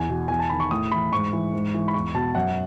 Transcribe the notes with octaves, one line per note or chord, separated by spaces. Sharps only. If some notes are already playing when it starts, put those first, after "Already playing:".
Already playing: E2 G#5
B2
E2 G#5
A5
D#3 B5
C#6
A2 D#6
E3 B5
G#2 C#6
E3
G#2
E3
B5
E2 C#6
B2 A5
F#2 F#5